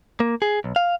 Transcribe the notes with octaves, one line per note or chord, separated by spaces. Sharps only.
A#3
G#4
B1
F5